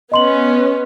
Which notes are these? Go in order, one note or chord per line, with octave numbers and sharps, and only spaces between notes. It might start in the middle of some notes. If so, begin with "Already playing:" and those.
B3 C#4 D#5 C6 F#7